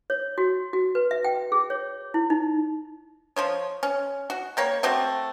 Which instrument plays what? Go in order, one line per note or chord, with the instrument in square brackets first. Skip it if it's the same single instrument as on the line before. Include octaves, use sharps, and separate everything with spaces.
[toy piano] C#5
F#4
F#4
B4
E5
G5
G#4
C#5
E4
D#4
[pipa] F3 C5 C#5
C#4
F#4
G3 A#3 C#5
A3 C4 F#4 G4